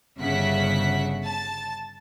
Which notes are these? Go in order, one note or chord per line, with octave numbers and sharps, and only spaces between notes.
G1 C#3 E5 F#5 B6
A5